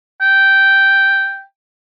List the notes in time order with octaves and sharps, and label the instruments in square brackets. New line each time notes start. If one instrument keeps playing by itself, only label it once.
[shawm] G5